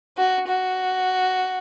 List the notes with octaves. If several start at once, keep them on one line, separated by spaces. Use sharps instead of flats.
F#4
F#4